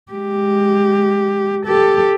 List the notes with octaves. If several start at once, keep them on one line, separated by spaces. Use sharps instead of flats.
G#3 G4
G4 A4